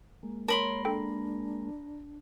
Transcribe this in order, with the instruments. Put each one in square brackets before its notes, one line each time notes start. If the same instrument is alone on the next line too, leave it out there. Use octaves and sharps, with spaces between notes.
[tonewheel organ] G#3 A#3
[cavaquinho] A#4 B5 C6 [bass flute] C#5 [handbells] A5
[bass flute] D4 [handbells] A4 G5